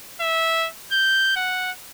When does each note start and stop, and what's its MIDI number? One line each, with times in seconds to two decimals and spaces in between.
0.20 0.68 76
0.92 1.34 91
1.36 1.71 78